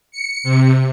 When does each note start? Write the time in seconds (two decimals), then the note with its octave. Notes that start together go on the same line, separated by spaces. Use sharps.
0.11 C#7
0.43 C3